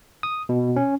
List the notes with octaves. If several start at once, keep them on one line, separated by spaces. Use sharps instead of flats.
D#6
B2
C#4